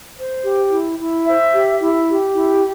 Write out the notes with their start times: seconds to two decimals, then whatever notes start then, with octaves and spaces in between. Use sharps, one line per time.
0.15 C5
0.42 G4
0.69 E4
0.97 E4
1.24 C5 E5
1.52 G4
1.80 E4
2.08 G4
2.34 E4